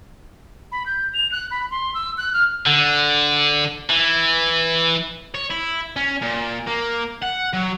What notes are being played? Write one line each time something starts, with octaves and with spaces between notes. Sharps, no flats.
B5
G6
F7
F#6
B5
C6
E6
F#6
F6
D3
E3
C#5
E4
C#4
A#2
A#3
F#5
F#3